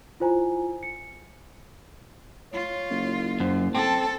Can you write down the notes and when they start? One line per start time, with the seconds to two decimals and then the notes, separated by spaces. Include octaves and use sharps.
0.20 E4 F4 C5 G#5 A#5
0.83 C#7
2.53 F4 C#5
2.90 F#1
3.40 F#2 C5
3.75 C4 A4 A5